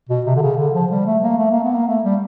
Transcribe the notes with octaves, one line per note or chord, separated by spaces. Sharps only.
B2
C3
D3
C#3
D3
F3
G3
A3
A#3
A3
A#3
B3
A#3
A3
G3